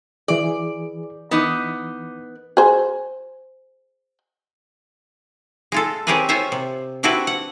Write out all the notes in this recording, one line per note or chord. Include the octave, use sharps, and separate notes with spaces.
E3 G#4 D5
E3 B3 D#4 D6
G#4 C5
G#3 F4 A4
C4 C#4 G4 G#4 A#4 B4
C#4 F4 C5 C#5 E5
C3
C4 D4 E4 F#4 G4 B4
F#5